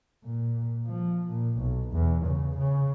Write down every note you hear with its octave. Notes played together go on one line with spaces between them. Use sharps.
A#2
F3
A#2
B1
E2
C#3
C#3